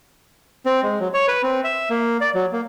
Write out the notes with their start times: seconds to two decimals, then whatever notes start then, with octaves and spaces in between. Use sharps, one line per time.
0.66 C4
0.83 G#3
1.00 F#3
1.14 C#5
1.28 B4
1.43 C4
1.64 E5
1.90 A#3
2.21 D5
2.34 F#3
2.52 A#3